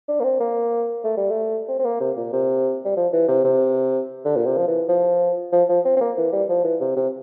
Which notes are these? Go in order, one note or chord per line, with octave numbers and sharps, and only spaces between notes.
D4
A#3
C4
A#3
A3
G3
A3
C4
C4
A#3
C3
A#2
C3
G3
F3
E3
C3
C3
D3
A#2
C3
F3
E3
F3
F3
F3
C4
C4
A#3
E3
G3
F3
E3
C3
C3